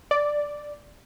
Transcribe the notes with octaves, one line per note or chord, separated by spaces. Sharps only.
D5